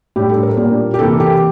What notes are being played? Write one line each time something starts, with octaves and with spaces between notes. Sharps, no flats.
A2 G3 D4 G4
A4
A#4
A#2 G3 A#3 D4
G4
C3 E3 A#3 A4
G4